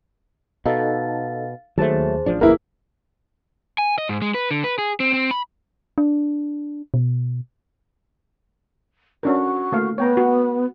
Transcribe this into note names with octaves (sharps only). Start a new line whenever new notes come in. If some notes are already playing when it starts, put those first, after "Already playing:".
B2 D#4 A4 F5 A6
D#2 F#3 A3 G#4 C5 A5
A1 F3 D4
F#1 E2 A#3 E4 G#4 A#4 B4
G#5
D#5
G#2
G#3
B4
D3
B4
G#4
C4
C4
B5
D4
B2
C#4 D4 F#4 A#4
A3 A#3 F5
B3 C#5 G5 A#5
F#4